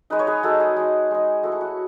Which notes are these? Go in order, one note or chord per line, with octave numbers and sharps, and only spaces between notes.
G#3 D#4 B4
C#5
G#4 B4
G#3 D#4 F#4 A4
G#4
G#3 D#4
G#3 D#4
A3 E4 F#4
G#4
F#4